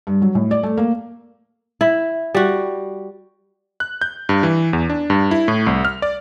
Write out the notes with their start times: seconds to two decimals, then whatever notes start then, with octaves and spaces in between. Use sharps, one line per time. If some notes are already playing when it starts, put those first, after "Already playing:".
0.07 G2
0.22 F#3
0.35 A2
0.51 D5
0.63 A3
0.77 A#3
1.81 E4
2.35 G3 F#4
3.80 F#6
4.02 G6
4.29 G2
4.43 E3
4.73 E2
4.90 D4
5.10 G2
5.31 E4
5.48 A2
5.67 C2
5.85 F6
6.02 D5